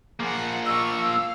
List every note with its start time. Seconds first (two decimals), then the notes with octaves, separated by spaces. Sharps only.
0.20 F3 A#3 G#4 F#5
0.66 D#5 C#6 E6
1.00 F5